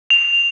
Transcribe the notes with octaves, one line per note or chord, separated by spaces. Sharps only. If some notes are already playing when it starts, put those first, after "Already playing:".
F7